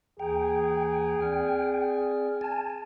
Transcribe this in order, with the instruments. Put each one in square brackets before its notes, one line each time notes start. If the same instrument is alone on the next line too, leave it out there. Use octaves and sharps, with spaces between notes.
[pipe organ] D#2 E3 A#5 [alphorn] G#4 [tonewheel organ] G5
[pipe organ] C4 D5 F6
[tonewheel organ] G#5 A5